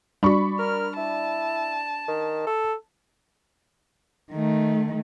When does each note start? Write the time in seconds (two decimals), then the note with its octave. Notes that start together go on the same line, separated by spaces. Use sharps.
0.23 G3 D4 F#4 B5 C#6
0.59 A#4 F6
0.97 E4 A5
2.08 D#3
2.47 A4
4.32 D#3 A3